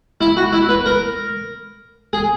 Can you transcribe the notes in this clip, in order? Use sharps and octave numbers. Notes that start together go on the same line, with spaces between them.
E4
F#4
E4
B4
A#4
G#4